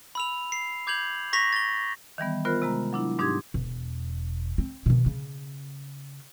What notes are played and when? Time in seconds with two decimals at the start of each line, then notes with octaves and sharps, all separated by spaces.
0.15 B5 E6 F7
0.52 C7
0.87 D6 G6 G#6 F7 F#7
1.33 C#6 A#6 B6 F7
1.53 A6 G7
2.18 D#3 E3 G3 B3
2.45 B3 F4 A#4 C5 F#6
2.62 C3 G#3 A#5
2.93 F#3 D4 E4
3.19 G#2 D4 D#4 G4 C6 G#6
3.54 E1
4.58 C4
4.86 B2 D#3
5.06 C#3